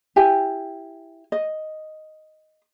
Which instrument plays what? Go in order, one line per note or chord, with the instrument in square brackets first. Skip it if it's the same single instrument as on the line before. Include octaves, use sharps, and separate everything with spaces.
[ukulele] E4 G4 G#5
D#5